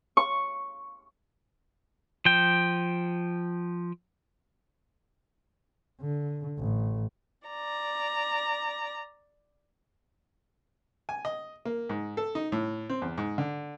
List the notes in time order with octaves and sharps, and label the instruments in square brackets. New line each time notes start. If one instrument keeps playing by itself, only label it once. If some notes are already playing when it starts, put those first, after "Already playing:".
[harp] C#6
[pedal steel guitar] F3 G5
[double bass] D3
A1
[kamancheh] D5 A#5
[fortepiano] G#5
D#5
A#3
G#2
A4
D#4
A2
C4
E2
G#2
D3